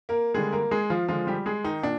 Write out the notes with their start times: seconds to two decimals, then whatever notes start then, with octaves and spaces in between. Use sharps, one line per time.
0.09 A#3 A#4
0.34 D3 G3 G#3 A#3 G#4
0.52 A#3 A#4
0.71 G#3 G#4
0.90 F3 F4
1.08 D3 F3 G#3 F4
1.27 G3 G4
1.46 G#3 G#4
1.64 D#3 D#4
1.83 A#2 D4